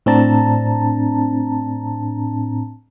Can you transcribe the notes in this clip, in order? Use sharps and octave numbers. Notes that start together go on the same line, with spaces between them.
A2 C4 D4 A5 A#5